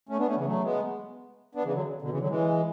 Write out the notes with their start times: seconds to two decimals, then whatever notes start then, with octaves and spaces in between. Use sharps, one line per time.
0.09 A3 C#4
0.18 B3 D4
0.27 A3 C#4
0.36 C#3 E3
0.46 F#3 A3
0.64 G#3 B3
1.55 B3 D4
1.64 C#3 E3
1.74 D3 F#3
2.02 B2 D3
2.10 C#3 E3
2.19 D3 F#3
2.29 E3 G#3